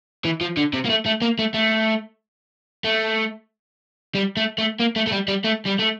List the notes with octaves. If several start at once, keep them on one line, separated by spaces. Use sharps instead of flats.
E3
F3
D3
C3
A#3
A3
A3
A#3
A3
A3
A3
G3
A3
A3
A#3
A3
A3
G3
G3
A3
G3
A3